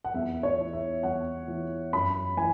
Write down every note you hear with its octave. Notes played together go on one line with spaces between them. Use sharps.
F#5
E2 E5
C#5
E3
E5
E2 F#5
E3
F#2 B5
E3 G#5